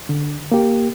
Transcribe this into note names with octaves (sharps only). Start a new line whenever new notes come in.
D3
A#3 G4